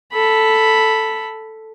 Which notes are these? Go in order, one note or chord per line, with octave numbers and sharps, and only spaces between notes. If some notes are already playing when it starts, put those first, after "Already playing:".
A4 B5